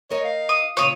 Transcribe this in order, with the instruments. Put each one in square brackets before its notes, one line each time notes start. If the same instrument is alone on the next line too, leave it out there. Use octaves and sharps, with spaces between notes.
[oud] D#4 A#4 D#5 [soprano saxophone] C#5
[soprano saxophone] F5
[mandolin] D#6
[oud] D#2 A#2 C#3 [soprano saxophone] F4 [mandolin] C#5 D#6